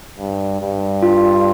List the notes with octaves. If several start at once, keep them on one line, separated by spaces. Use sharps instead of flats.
G2
G2
F4